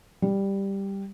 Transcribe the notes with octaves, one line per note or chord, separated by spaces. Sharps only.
G3